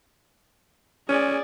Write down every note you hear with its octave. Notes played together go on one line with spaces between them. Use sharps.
C#4 G#4 D5